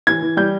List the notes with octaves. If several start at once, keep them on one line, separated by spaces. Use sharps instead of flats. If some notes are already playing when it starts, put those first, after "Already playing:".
E3 G#6
E3
G3 G6